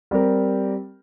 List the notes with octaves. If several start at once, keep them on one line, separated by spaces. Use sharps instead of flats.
G3 C4 G4 A#4